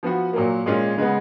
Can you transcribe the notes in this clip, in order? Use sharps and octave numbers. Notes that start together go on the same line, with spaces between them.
F3 B3 F#4
A#2 F#3 A#3
A#2 G#3 C#4 F4
C#3 G#3 B3